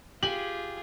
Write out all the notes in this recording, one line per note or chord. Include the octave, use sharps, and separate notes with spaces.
F4 G4 G#4 G#5 F#7